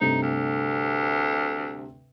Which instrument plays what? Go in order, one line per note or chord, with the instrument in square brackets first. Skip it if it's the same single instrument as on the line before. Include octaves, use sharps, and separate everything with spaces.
[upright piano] G2 C3 A3 [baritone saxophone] D#4
[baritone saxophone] D2